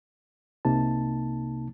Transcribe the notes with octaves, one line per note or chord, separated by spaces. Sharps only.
C2 C3 A#3 D#4 A5